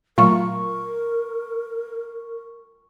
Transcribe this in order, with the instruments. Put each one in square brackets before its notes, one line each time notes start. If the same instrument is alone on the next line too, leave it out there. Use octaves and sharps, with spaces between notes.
[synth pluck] A#2 F#3 A3 [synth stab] F4 [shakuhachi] A#4 [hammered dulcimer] C#6